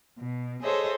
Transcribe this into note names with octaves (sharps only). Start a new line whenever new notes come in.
B2
G#4 A4 C5 C#5 D#5 E5